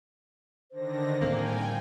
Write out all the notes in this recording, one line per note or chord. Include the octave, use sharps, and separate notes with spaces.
D3 D#3 C5 A#6
A2 G3 A#3 C4 G5 G#5